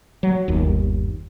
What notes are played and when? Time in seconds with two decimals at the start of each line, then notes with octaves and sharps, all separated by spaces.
0.23 F#3
0.48 G1 D#2